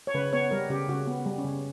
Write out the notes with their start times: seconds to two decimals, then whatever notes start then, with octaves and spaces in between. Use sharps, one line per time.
0.07 C#5
0.14 C#3 B4
0.33 B3 C#5
0.51 G3 A#4
0.70 C#3 G4
0.88 C#3 F#4
1.07 B3
1.26 G3
1.38 C#4
1.44 C#3